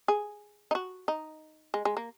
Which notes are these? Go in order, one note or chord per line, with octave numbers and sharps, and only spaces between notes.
G#4
D#4
F#4
D#4
G#3
G#3
A#3